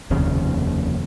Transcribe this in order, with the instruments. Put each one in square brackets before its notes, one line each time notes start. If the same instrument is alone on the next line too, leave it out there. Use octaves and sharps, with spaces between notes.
[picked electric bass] F1 D#2 C#3